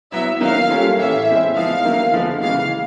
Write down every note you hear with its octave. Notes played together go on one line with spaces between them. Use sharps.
F#3 B3 E4 E5
D#3 F#3 A#3 F5
G3 A#3 C#4 F4 A4
A2 E3 A3 C#4 E5
G#3 C4 E4 G#4
F3 G#3 B3 D#4 F5
D#3 F#3 A#3
D3 F3 G#3 B3 D#4
C#3 E3 G#3 F5